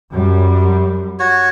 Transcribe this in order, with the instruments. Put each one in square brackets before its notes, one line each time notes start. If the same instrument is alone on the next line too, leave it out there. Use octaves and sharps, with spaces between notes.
[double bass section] F#2 G3
[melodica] F#4 C#5